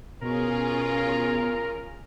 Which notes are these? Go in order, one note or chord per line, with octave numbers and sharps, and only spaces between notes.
B2 C#4 F4 G#4 A#4